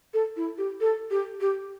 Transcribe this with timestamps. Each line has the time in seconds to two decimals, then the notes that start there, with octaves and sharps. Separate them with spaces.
0.14 A4
0.37 E4
0.58 G4
0.81 A4
1.11 G4
1.41 G4